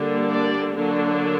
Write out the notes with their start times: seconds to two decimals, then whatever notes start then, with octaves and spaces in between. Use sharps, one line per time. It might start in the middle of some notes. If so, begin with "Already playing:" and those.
Already playing: D3 G3 A#3 D4
0.30 D5
0.76 D3 F#3 A#3 D4